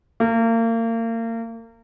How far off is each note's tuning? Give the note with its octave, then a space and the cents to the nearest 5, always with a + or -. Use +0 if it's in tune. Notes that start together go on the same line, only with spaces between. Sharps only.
A#3 -35